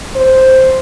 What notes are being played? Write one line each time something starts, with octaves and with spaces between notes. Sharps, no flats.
C5